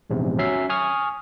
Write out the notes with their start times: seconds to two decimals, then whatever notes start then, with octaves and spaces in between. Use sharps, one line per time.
0.10 A#1 E2 G#2 C3
0.38 F#3 C#4 E5 C7
0.70 G#5 C#6 D#6 F6